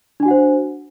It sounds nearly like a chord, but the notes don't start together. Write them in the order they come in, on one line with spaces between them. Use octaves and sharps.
D4 G#5 F#4 F#5 C5